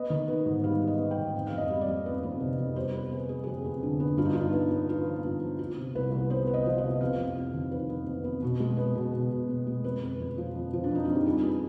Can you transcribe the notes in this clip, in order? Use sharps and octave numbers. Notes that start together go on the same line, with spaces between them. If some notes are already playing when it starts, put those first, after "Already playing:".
Already playing: B3 D#5
D#3
B3
G#2
G3 F5
G3
D#5
B3
G5
G#2
F2
F5
F2
D#5
G3
D5
F2
B3
F2
C3
F2
G3 C5
B3 B4
B3 G#4
G3 G#4
G#4
F2 G4
F2
D3
B3
G2 F4
D#4
G2 F4
B3
B3
B3 F4
F3
G2
F3
B3 F4
C3
C2 B4
C2
B3 C5
B3
D#5
F3
D#5
C3
F2 F5
F2
F2
D#3
F2 B4
B3
F2
B3
B2
G#3
B3
B2
B2
B2
B2
G#3
F2 B4
F2
F2
F3
F2
F3
D4
F2 D#4
F2 F4
G4
G3 G#4
B3